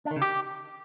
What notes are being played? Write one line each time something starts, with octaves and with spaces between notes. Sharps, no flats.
D4
D#3
C#3
G4